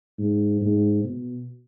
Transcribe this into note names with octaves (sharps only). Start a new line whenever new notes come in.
G#2
G#2
B2